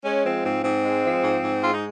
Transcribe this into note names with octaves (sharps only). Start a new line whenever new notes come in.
G#3 C#4
F3 C4
G#2 C4
G#2 C4
G#3
F3
G#2
G#2
G#3 F4
D#4